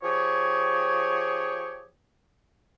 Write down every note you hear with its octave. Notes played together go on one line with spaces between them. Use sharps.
F3 G4 G#4 C#5